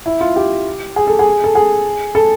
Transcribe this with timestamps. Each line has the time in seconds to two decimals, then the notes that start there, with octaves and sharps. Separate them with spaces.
0.06 E4
0.21 F4
0.36 G4
0.96 G#4
1.07 A4
1.19 G#4
1.44 A4
1.55 G#4
2.15 A4